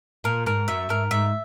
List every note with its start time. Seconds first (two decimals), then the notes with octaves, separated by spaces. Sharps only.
0.24 A#2 A#4
0.46 G#2 A#4
0.68 F#2 E5
0.89 G#2 A#4
1.11 G#2 E5